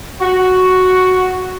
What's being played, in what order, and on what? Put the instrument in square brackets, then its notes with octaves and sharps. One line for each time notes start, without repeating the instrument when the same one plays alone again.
[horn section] F#4